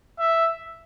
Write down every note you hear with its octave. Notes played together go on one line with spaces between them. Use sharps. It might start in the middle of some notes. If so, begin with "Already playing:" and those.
E5